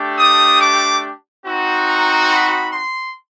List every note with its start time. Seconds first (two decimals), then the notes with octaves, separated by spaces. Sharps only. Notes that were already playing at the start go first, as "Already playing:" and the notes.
Already playing: A3 D4 G4
0.17 D#6
0.60 D6
1.46 C4 D#4 F#4
1.87 A#5
2.30 B5
2.73 C6